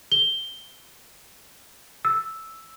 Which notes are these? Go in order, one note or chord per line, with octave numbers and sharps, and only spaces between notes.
G7
E6